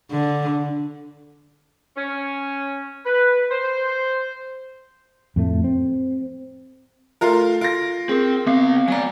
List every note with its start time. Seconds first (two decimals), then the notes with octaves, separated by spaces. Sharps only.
0.11 D3
1.97 C#4
3.06 B4
3.51 C5
5.36 F2 A2 A3
5.64 C4
7.21 A3 F4 A#4
7.61 F4 A#6 D7
8.09 C4 G#4 A#4
8.47 C#2 B3 C4 F5
8.88 F#3 D5 G#5 A#5